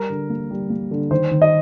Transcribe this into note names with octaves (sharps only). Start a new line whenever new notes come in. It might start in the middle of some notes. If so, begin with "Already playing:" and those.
Already playing: G3 A#4
D3
A#3
G3
A#3
D3
D#3 C5
D#3
D#5